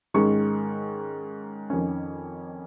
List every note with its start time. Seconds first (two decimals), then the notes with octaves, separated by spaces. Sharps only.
0.14 G#2 D#3 G#3 C#4 C#6
1.70 F2 D#3 C#4